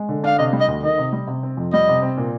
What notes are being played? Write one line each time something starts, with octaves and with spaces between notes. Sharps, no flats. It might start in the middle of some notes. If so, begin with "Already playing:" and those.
Already playing: G#3
D3
D4 F5
C3 D#5
G3
D#5
D2
D#3 D#5
C3
G3
C3
C4
F2
G3 D#5
C3
C4
A#2